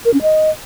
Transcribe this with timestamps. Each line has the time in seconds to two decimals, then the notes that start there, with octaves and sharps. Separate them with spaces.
0.05 A#4
0.14 C#4
0.22 D#5